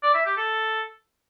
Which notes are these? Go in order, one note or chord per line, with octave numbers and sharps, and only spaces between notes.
D5
E5
G4
A4